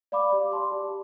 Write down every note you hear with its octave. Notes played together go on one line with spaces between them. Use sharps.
D5 F5 B5 D6
G4
D5 A5 C6
G4